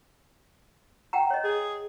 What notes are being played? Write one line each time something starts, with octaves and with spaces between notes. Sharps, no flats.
F#5 G5 A#5
C#5 D#5
G#4